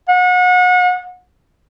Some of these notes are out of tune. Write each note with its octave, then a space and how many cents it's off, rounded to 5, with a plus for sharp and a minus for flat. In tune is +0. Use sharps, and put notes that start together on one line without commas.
F#5 -35